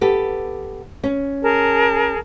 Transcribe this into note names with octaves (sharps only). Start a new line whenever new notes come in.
B3 G4 A4
C#4
G#4 A#4 A5